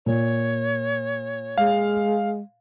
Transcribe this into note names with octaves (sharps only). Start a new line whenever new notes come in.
A#2 C#5
G#3 F5